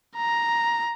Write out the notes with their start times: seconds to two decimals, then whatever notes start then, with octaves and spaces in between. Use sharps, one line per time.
0.17 A#5